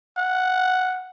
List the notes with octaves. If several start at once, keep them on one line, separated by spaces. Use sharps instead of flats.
F#5